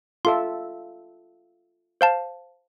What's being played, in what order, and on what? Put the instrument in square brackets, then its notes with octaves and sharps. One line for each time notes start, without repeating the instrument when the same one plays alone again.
[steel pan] F4 A4 E5 [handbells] C6
[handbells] C5 F5 A5